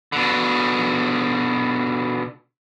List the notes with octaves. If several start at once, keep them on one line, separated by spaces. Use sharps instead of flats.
B2 D3